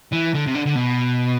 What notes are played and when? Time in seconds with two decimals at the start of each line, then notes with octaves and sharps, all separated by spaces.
0.12 E3
0.34 D3
0.46 C3
0.55 D3
0.66 D3
0.75 B2